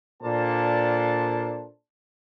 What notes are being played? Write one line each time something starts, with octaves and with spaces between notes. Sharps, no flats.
A#2 A#3 D4 A4 C5 A5